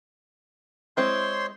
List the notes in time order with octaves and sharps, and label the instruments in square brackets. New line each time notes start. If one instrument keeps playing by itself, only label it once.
[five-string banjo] G#3 C4 E4 [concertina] C5 C#5 C6